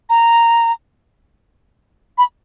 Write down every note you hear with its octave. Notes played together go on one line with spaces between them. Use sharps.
A#5
B5